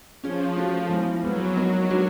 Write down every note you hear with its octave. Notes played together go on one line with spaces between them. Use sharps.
F3 C#4 F4 G#4 C#5
A3 C#4 F#4 A4
F3 G#3 B3 E4
F3 F#3 G#3 B3
F#3 B3 D#4 F#4 A#4
G#3 B3 D4 F#4 A#4